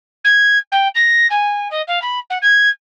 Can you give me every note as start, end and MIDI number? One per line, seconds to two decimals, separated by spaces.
0.24 0.58 92
0.72 0.88 79
0.95 1.26 94
1.30 1.68 80
1.70 1.81 75
1.87 1.99 77
2.02 2.19 83
2.30 2.38 78
2.42 2.69 92